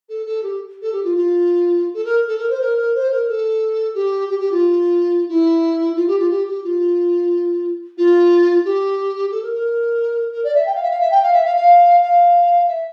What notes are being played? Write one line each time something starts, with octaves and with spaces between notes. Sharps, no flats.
A4
A4
G4
A4
G4
F4
F4
A4
A#4
A4
A#4
C5
A#4
A#4
C5
A#4
A4
G4
G4
G4
F4
E4
F4
G4
F4
G4
G4
F4
F4
G4
A4
A#4
A#4
A#4
D5
E5
G5
F5
E5
F5
E5
G5
F5
E5
F5
F5
F5
E5